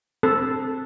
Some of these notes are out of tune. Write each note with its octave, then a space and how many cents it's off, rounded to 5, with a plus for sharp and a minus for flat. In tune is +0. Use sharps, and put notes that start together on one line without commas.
C4 +0 A4 +0